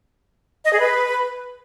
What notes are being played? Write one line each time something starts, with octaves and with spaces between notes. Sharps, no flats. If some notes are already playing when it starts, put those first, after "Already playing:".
D#5
G#4
B4